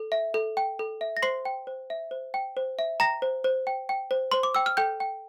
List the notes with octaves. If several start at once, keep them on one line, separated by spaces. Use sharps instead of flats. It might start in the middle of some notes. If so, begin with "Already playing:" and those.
Already playing: A4
E5
A4
G5
A4
E5
A#6
C5 C6 C7
G5
C5
E5
C5
G5
C5
E5
G5 A#5 A#6
C5
C5
G5
G5
C5
C5 C6
D6
G5 E6
F6
A4 G5 G6
G5